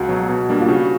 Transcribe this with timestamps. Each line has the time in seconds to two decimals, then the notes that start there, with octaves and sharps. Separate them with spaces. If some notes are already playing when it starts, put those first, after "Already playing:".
Already playing: C#2 F#4
0.08 B2 F#3
0.29 B2
0.49 G3 A#3 D4
0.60 F4
0.68 C#3 F#4